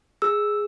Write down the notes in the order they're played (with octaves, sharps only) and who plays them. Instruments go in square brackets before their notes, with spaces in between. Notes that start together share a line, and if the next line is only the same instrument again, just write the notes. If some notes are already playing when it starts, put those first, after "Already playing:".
[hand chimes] G#4 E6